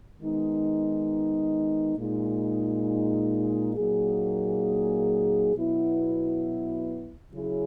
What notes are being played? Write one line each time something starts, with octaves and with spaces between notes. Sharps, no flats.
D#3 G#3 B3 D#4
A#2 G#3 D#4
A#2 F#3 A#3 D#4 G#4
B2 F#3 B3 E4
C#3 F#3 C#4 E4 G#4